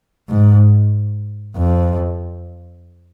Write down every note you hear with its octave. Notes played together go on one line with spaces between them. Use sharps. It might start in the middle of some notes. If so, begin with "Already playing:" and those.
G#2
F2